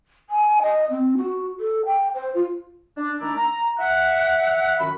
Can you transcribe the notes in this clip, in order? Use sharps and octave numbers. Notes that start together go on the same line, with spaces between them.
G#5
D#5
C4
F#4
A4
G5
C5
F4
D4
D#3 A3 D4 E4 D5 A#5
A#5
E5 F#5
F#2 D#3 F#4 B5